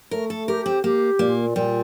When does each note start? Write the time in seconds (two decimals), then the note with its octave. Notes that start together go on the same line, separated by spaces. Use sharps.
0.11 A3 A#4
0.30 A4
0.48 G4 A#4
0.66 C4
0.83 A#3 G4
1.19 A#2 A#3
1.56 A#2 G3